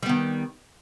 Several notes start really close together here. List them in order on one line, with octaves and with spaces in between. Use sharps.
G3 B3 D#3